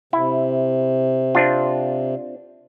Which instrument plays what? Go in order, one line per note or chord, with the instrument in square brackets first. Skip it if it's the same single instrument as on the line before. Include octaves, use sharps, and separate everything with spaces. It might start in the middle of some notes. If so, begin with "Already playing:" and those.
[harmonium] C3 [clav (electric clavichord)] E4
[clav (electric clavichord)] C4 D4 F4